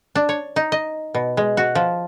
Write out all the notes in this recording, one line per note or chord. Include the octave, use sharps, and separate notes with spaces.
D4
C#5
D#4
D#5
B2
G#3
F#4
F3